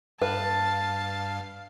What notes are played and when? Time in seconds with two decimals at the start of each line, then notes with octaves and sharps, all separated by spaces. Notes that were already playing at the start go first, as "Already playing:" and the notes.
0.22 G2 B4 F5 A5